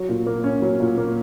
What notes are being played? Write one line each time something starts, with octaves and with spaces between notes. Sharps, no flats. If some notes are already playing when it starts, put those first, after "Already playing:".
Already playing: F#3
A#2
A#3
C#4
F#3
A#2
A#3